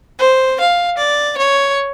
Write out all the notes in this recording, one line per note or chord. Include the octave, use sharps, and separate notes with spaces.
C5
F5
D5
C#5